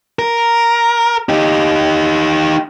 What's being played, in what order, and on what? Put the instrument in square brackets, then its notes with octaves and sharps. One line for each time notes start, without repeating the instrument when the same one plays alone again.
[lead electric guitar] A#4
D#4 G4